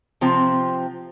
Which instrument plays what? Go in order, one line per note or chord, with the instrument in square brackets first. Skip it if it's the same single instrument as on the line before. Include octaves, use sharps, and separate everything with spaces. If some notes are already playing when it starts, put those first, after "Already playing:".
[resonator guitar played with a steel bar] C3 F3 C4